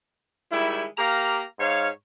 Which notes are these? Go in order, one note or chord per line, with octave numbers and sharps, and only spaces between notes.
D#3 G3 G#3 E4
A#3 G4 F5 A#5
G#2 C#5 F5